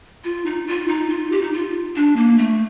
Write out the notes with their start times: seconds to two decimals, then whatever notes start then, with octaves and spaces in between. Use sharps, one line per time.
0.24 F4
0.46 D#4
0.67 F4
0.88 D#4
1.10 F4
1.32 G4
1.42 D#4
1.53 F4
1.96 D4
2.16 A#3
2.38 A3